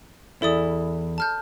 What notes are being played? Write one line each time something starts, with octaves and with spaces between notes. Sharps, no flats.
E2 E4 A4 D5 D#6
A5 F6 G6